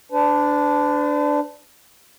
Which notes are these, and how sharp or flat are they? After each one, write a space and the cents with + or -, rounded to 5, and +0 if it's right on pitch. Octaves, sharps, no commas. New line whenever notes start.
D4 -5 B4 +45